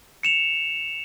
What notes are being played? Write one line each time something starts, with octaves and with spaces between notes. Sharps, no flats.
C#7 E7 F7